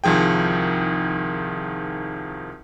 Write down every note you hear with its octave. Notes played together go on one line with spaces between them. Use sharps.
C2 D#3 F3 G#4 G5